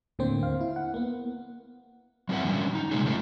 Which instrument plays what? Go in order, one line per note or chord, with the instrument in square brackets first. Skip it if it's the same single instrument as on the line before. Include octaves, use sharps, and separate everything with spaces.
[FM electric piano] D#2 A2 D3 A#3 C4 C5
F5
E4
F#5
A#3 B3
[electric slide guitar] F#3 C4 E4 A#4 E5 F#5
D3 F#3 G3 C#4
D#4
C3 G#3 A#3 C#4 G#4
A3 D#4 F4 A#4